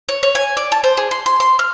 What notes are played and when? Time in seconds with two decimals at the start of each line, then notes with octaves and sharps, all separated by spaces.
0.09 C#5
0.23 C#5
0.35 G#5
0.57 D5
0.72 A5
0.84 C5
0.97 G#4
1.11 C6
1.26 C6
1.40 C6
1.59 F6